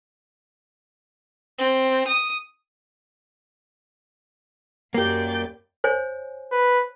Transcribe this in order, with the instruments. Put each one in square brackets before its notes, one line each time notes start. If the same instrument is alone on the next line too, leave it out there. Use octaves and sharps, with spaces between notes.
[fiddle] C4
D#6
[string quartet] F#2 D5 G6 [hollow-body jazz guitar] A#3 G4
[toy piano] C5 C#5 G#5
[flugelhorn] B4